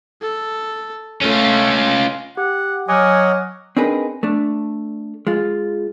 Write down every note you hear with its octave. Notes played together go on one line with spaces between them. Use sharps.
A4
A3 C#4 F4
G4 F#5
F#3 C#5 D#5 F#5 G#5 D6 F6
C4 D4 D#4 G#4 A#4 B4
A3 D4
G#3 F4